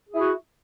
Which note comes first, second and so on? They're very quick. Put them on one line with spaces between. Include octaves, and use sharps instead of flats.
G#4 E4 F#4